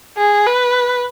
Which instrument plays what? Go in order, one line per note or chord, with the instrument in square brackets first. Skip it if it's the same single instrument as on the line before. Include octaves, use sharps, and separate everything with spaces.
[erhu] G#4
B4